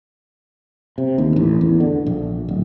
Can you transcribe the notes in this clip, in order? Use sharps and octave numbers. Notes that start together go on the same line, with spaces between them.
C3
D#2
A1
E2
D3
A#1
D1